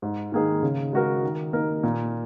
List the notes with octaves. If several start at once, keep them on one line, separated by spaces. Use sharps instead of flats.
G#2
D#3 A#3 D#4 G#4
C#3
G#3 F#4 A#4
D#3
A#3 D#4 A#4
A#2